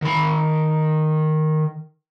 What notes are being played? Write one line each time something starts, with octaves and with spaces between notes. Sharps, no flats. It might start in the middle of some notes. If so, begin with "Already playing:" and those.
D#3 B5